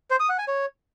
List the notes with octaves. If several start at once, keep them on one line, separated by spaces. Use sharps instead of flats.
C5
D#6
F#5
G#5
C#5